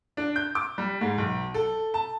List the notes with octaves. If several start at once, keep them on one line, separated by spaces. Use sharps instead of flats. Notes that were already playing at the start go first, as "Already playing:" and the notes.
D4
G6
D6
G3
G#2
B1
A4
A5